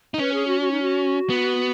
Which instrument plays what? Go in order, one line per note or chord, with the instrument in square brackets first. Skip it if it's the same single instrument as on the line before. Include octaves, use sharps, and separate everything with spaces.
[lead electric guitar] D#4
[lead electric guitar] C#4 [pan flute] B4
[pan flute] G#4
F#4
F#4
D#4
F#4
[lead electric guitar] B3